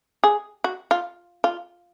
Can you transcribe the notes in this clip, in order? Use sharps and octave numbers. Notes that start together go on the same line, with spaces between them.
G#4
F#4
F4
F4